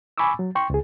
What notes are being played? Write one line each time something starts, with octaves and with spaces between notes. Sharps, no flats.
G#5 B5 C#6 D6 E6
F#3
G5 C6 C#6
C#2 G#4